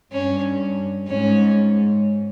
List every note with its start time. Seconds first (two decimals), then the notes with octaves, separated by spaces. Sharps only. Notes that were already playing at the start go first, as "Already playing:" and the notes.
0.12 G2 C#4
1.07 G#2 C#4